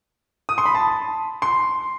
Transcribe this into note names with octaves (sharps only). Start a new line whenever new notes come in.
D#6
C6
B5
A5
C6